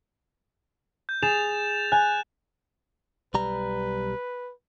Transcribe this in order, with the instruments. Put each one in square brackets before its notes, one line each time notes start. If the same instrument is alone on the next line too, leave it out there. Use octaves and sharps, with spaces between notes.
[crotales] G6
[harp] G#4 [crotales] A6 E7 F7
[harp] G#5 [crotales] F#6
[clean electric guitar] B1 G3 A#5 [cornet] B4